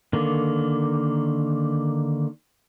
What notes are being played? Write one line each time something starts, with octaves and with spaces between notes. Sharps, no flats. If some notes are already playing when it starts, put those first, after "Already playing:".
D3 D#3 A#3